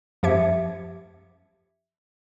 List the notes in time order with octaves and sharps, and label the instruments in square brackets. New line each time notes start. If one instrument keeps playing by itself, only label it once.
[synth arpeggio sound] F#2 F3 G4 E5 G#6 C#7